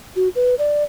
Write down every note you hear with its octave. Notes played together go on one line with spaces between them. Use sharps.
F#4
B4
D5